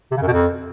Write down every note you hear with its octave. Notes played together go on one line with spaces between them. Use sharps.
C3
C#3
F#2
B2
F2